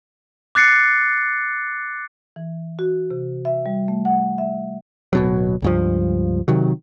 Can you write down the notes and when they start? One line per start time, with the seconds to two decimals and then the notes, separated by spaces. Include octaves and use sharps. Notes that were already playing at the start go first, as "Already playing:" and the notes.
0.55 D6 F#6 A6 C7 C#7
2.36 E3
2.79 F#4
3.11 C3
3.45 E5
3.66 G3
3.88 A3
4.05 F#5
4.38 E5
5.13 D1 B2 F#3
5.62 C#2 G2 F3
6.48 C3 D#3 F#3